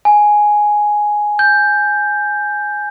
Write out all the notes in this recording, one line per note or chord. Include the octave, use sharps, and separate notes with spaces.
G#5
G6